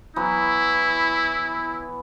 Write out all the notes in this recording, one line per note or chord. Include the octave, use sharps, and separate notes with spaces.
E3 F#3 B3 E4